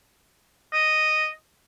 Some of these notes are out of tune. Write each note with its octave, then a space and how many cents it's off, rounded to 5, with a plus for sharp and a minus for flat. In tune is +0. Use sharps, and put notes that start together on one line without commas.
D#5 -5